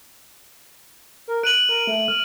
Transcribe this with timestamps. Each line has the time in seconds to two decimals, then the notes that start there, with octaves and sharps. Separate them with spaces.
1.28 A#4
1.43 F#6 D7 D#7 F#7
1.69 A#4
1.87 A3
2.08 F6